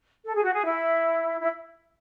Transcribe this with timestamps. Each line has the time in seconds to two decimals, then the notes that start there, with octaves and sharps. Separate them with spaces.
0.25 A4
0.35 G#4
0.44 F#4
0.54 G#4
0.66 E4
1.40 E4